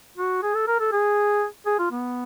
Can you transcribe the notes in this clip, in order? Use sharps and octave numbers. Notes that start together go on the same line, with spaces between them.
F#4
G#4
A4
A#4
A4
G#4
G#4
F4
B3